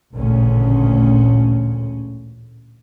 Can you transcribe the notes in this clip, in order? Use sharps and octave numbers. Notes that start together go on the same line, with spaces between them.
A1 D2 A#2 C#3 C#4